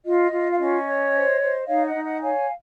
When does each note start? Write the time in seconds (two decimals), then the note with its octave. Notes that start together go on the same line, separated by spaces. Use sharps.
0.04 F4 D#5
0.31 F4
0.50 F5
0.58 C#4 D#5
0.86 C#5
1.13 C5
1.40 C5
1.67 D#4 C#5 F5
1.85 D#5 F#5
1.94 D#4
2.03 D#5 F#5
2.21 C#5 F5 G#5